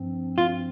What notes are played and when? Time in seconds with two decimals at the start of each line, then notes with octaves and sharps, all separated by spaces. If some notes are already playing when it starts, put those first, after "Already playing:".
Already playing: G2 F3 C4
0.38 F4